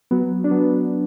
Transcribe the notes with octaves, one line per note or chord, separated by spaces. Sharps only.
F#3 B3
D4
F#3 B3